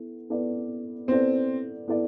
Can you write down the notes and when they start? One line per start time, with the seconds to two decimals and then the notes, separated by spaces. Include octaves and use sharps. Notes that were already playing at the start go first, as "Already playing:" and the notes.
Already playing: B3 E4 A4
0.30 B3 E4 A4 D5
1.08 B3 C4 E4 A4 D5
1.88 B3 E4 A4 D5